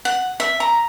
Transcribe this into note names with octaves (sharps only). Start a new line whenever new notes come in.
F#5
E5
A#5